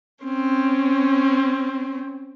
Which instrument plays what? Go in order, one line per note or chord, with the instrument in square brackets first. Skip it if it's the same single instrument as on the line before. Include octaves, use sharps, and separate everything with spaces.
[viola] C4 C#4